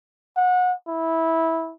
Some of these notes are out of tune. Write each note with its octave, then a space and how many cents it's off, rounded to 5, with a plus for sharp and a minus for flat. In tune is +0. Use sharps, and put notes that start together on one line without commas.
F#5 -25
E4 -15